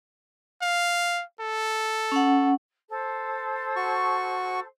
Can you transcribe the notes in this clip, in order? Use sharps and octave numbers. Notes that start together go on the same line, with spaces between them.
F5
A4
C#4 F#5
A4 C5
F#4 C#6